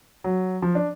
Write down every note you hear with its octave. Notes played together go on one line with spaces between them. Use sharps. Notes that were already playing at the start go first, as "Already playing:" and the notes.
F#3
F3
D4